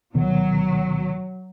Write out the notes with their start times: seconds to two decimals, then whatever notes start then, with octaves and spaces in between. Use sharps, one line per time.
0.14 D2 B2 D#3 F#3